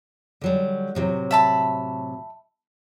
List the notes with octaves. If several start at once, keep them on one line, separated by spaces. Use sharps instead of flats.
D3 F#3 G3
A2 C3 F#3
E5 A5 B5